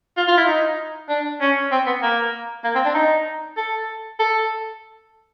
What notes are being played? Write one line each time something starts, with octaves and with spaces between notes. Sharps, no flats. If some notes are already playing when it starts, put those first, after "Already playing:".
F4
F4
E4
D#4
D4
C#4
C4
B3
A#3
A#3
C4
D4
D#4
A4
A4